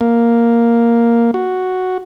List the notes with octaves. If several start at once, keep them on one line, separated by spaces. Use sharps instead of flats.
A#3
F#4